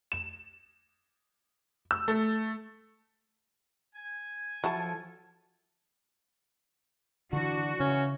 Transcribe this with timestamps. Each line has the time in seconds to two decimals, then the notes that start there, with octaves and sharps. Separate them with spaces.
0.12 E7
1.91 E6
2.08 A3
3.96 G#5
4.64 F3 F#3 E4 F4 A4 A5
7.33 D3 E3 D4 F#4
7.80 C#3 E3 C#4